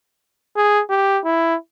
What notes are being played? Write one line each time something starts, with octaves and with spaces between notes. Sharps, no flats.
G#4
G4
E4